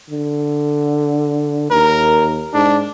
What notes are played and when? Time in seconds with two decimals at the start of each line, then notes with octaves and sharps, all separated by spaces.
0.10 D3
1.71 D#2 A#4
2.54 G#2 D4